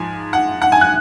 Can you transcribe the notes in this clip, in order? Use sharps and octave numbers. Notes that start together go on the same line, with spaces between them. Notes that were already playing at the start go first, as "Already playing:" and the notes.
Already playing: G#2 F3 G#5
F#5
F#5
G#5
F#6